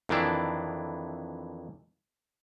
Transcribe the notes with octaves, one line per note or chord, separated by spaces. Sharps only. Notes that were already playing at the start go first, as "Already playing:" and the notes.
F2 D#3 E3 D4 E4